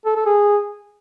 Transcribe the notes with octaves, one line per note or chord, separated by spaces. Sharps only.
A4
A4
G#4